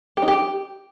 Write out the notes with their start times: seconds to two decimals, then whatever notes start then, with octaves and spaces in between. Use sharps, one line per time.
0.17 G4
0.22 D#4
0.28 G4